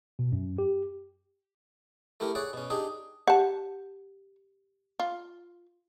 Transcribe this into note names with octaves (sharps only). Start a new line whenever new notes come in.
B2
F#2
G4
A3 E4 G4 A#4
G#4 C#5 D5 F#5
B2 C#4
D4 D#4 G4 G#4
G4 F#5 A5
F4